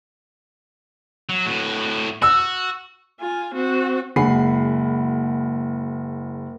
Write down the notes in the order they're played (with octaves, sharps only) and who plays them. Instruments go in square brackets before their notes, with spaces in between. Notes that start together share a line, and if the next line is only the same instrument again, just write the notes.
[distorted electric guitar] F#3
A2 F#4
[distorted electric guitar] F#4 [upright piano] E6
[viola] F4 G#5
C4 F#4
[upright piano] F#1 G#3 F#5 G#5 B5 C7